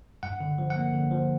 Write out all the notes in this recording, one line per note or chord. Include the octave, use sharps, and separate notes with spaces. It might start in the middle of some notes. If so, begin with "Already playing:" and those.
G2 F#5
D3
F3
F#5
A#3
D3
F3